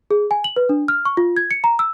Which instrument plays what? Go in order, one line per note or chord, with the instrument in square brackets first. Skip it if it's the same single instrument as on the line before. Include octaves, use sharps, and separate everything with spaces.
[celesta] G#4
G#5
F#7
B4
D4
F6
C#6
F4
G#6
C#7
A#5
E6